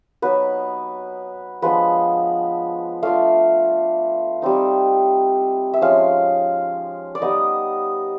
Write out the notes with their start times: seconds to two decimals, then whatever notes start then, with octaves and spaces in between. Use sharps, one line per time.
0.22 F#3 B3 D#4 B4
1.62 F3 G#3 B3 D4 B4
3.03 A3 D4 F4 F5
4.42 G3 C4 D#4
5.73 E5
5.81 F3 G#3 C#4 F5
7.15 D5
7.22 G3 B3 D#4 D#5